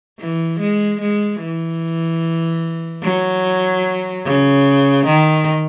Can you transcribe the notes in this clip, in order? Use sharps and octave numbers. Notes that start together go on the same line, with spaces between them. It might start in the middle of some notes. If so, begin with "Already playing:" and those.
E3
G#3
G#3
E3
F#3
C#3
D#3